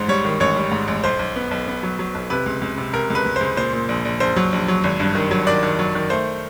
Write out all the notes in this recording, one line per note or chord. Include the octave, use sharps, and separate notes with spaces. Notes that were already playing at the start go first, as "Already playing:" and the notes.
Already playing: A1 G#2 C5
G3 C#5
D#3
A1 C#5
G3
G#2
A1
B1 C5
B1
B3
B1
B3
F#3
F#3
B1
C3 B4
C#2
C#2
C3
C3 A#4
C#2
B4
C#2
C#2 C5
A#2 C5
A#2
A#1
A#1
A#1 C5
F#3
A#1
F#3
G#1
G2
D#3
F#3
D#3 D5
D#3
F#3
D#3
A3 C5